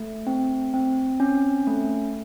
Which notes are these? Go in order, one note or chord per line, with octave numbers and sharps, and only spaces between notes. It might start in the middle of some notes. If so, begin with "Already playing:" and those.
Already playing: A3
C4
C4
C#4
A3